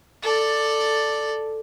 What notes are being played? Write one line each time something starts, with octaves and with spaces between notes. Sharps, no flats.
A4 D5